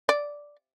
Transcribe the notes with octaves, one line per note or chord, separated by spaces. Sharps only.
D5